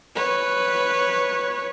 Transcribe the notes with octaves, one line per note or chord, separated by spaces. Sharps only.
B4 C#5